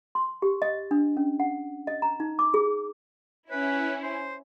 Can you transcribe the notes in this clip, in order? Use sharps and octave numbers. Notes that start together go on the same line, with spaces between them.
C6
G4
D#5
D4
C#4
F#5
D#5
A#5
D#4
D6
G#4
C#4 E4 B4
C5